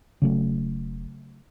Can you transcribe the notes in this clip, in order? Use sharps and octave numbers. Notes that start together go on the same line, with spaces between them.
E1 C#3 F#3 A3